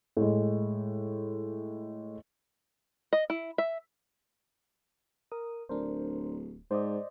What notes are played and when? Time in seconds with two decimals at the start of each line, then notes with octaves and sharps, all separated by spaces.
0.17 A2 G#3
3.13 D#5
3.30 E4
3.58 E5
5.32 A#4 D#6
5.69 D1 D4 A#4 C5
6.71 G#2 C5 D5 D#5